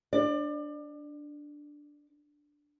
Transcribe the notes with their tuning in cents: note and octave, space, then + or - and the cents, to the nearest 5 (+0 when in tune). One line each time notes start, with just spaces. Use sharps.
D4 +0 D5 +30